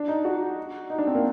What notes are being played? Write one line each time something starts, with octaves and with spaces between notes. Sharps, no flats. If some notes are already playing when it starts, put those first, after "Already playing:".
Already playing: D4
D#4
F#4
D#4
D4
C4
A#3